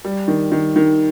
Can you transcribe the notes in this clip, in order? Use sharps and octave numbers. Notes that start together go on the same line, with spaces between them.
G3
D#3
D#3
D#3